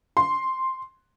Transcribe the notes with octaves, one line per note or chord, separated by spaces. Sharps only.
C6